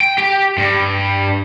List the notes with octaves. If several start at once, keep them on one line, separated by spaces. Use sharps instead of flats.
G5
G4
G2